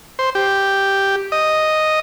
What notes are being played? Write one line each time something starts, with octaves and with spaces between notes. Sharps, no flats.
C5
G4
D#5